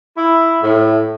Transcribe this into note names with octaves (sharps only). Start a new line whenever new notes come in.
E4
A2